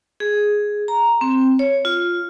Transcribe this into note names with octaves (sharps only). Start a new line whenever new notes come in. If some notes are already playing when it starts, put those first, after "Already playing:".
G#4
A#5
C4
C#5
F4